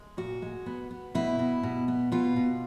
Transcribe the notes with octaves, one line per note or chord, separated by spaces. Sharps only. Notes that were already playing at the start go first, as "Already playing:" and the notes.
Already playing: G#3
A#2 F#4
G#3
B3
B3
B2 E4
B2
B2
B3
B2 F4
B2